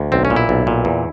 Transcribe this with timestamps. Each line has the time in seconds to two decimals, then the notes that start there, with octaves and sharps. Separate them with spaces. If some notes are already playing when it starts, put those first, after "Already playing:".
Already playing: D2
0.12 B1 C4
0.25 C#4
0.30 A#2
0.36 E4
0.49 B1
0.67 A#2
0.85 E2